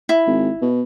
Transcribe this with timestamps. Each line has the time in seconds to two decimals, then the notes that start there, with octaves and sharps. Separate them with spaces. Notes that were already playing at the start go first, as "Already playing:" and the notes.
0.09 E4
0.27 G#1
0.61 B2